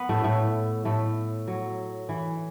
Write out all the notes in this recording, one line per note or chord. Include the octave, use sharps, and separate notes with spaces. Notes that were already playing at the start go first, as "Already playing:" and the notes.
Already playing: B3 B4
A2 A3
A2 A3
A2 A3
F#3
E3